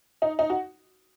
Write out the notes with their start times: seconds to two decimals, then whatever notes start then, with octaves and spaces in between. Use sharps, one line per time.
0.22 D#4
0.39 D#4
0.50 F#4